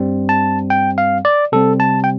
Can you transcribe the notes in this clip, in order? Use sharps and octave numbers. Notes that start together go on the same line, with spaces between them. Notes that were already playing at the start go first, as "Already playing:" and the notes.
Already playing: G2 G3 C4
A5
G5
F5
D5
C3 G3 C4 A4
A5
G5